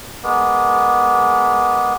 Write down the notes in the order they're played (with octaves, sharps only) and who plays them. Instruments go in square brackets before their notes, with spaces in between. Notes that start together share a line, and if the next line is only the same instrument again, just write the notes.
[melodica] G#3 A#3 B3